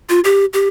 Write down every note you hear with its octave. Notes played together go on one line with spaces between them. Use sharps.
F4
G4
G4